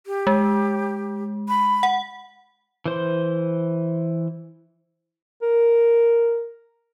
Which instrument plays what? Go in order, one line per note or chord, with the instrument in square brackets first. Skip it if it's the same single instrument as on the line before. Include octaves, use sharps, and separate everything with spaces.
[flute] G4
[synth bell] G#3
[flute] B5
[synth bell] F#5
[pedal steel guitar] E3 C5 C6
[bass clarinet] A#4